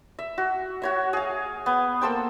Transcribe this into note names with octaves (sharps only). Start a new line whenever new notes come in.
E5
F#4
F#4 C#5 E5
G#4 F5
B3
A#3 A4 C5 G5